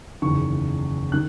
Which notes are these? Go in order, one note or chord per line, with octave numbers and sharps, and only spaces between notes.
F#1 E2 D#3 C#6
D#3 F#6